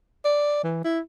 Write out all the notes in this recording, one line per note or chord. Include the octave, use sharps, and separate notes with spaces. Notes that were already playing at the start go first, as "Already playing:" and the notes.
D5
E3
E4